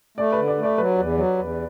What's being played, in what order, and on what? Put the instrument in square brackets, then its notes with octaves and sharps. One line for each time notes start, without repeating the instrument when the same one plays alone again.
[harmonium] A3 [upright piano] D5
[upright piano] B4
[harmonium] D3
[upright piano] D5
[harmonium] A3
[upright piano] D5
[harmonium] F#3 [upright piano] B4
[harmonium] E2
F#3
E2